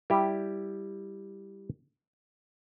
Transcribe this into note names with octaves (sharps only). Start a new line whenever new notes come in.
G3 E4 G4